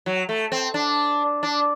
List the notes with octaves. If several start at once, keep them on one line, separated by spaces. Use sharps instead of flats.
F#3
A3
C4
D4
D4